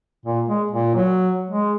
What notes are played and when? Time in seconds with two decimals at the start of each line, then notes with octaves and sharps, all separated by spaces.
0.26 A#2
0.48 G#3
0.71 A#2
0.95 F#3
1.50 G#3